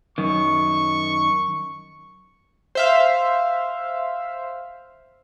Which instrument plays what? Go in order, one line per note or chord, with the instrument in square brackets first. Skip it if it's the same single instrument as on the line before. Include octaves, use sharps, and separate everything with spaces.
[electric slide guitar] F#2 D#3 [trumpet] C#6
[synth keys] C5 E5 F5